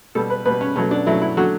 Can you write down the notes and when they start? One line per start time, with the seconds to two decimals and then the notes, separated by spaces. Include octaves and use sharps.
0.15 B2 G3 A4
0.30 B4
0.45 B2 G3 B4
0.61 C#4
0.76 B2 F#3 A3 C#4
0.91 D4
1.06 B2 F#3 A3 E4
1.22 E4
1.37 D3 F#3 A3 F#4